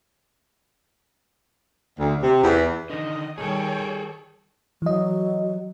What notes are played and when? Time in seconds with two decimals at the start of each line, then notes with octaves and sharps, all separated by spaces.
2.00 D2
2.23 C3
2.44 E2
2.90 D3 D#3 D#5
3.38 D#3 G3 G#4 A4 C#5 G5
4.82 E3 F#3 D#5